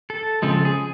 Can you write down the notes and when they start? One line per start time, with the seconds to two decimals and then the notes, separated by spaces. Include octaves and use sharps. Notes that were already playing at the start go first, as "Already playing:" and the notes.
0.10 A4
0.42 C#3 F3 G#3 C4 A4
0.65 G#4